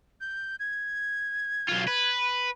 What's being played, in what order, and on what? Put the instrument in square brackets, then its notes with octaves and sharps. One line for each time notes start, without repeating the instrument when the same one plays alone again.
[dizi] G6
G#6
[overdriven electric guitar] B1 F4
B4